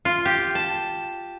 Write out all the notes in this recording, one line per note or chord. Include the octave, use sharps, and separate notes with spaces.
F4
G4
A5